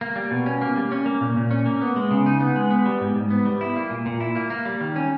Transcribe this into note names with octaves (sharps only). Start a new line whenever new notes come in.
A#3
G3
B2
C#4
A#3
G3
C#4
A#3
A#2
A#2
C#4
A#3
B3
G#3
C#3
D#4
B3
G#3
B3
G3
G#2
G#2
B3
G3
E4
A#3
A#2
A#2
E4
A#3
A#3
G3
D#3
C#4